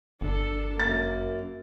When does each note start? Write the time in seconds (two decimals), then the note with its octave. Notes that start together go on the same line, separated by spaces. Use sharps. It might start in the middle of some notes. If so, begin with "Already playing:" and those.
0.21 G1 D4 A4
0.80 F#2 A#3 A6